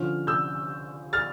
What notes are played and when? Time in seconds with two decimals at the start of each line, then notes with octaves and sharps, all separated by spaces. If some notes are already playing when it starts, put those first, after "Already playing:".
Already playing: D3 F3 C#4 F4 F6
0.27 E6 G6
1.13 F6 A6